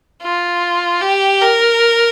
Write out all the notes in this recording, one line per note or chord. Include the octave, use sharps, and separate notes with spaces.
F4
G4
A#4